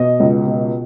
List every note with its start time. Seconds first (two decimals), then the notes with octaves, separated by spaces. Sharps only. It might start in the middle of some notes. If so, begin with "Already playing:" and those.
Already playing: B2 D#5
0.20 C#2
0.46 B2